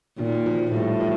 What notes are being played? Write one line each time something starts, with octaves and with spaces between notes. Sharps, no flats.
A#2 D#3
F3
A2 G3
F3